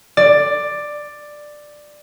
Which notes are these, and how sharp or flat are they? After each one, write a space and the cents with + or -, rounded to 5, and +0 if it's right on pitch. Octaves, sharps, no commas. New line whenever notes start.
D5 +10